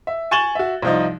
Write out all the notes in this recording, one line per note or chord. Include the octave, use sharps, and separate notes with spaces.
E5
G#5 C#6 A6 E7 F#7 G7
F#4 E5
C2 F3 D#4